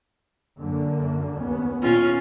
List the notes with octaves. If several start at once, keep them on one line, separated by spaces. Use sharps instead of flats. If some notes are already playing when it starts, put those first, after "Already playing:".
F#2 D3 A#3
D#2 B3 C#4
A#2 C#4 F4